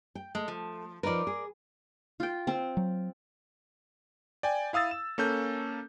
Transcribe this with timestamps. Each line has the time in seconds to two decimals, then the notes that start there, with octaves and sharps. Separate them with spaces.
0.15 G5
0.35 G#3 A3
0.48 F3
1.03 F3 D#4 A#4 B4 D5
1.27 G#4
2.20 F4 G5
2.47 C4
2.77 F#3
4.43 D5 G5 G#5
4.73 E4 F5 D#6 E6 A6
4.91 E7
5.18 A#3 C#4 A4 G6